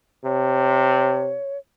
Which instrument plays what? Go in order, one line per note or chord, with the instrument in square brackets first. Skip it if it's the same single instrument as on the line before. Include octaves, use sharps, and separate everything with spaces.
[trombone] C3 [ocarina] C#5